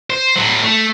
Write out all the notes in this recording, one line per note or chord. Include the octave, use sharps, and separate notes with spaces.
C5
A2 F#3
A3